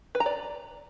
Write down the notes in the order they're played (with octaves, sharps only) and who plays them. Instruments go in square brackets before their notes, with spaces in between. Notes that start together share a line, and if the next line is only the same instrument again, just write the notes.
[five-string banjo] B4
A#5
D5